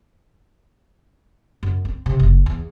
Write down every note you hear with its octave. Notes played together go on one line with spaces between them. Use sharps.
F#2
C4
C3
F#1
E2